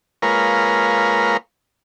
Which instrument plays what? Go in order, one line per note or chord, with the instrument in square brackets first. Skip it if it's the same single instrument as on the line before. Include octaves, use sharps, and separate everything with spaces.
[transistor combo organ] G#3 A#3 F4 A#4 B4 C#5